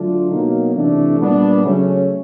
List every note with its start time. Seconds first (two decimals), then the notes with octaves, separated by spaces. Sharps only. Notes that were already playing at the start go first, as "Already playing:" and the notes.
Already playing: D3 F#3 A3 D4 F4
0.30 B2 F#3 A#3 D#4
0.75 C3 E3 A3 D4
1.19 A#2 G3 B3 D4
1.64 C#3 F#3 A3 C#4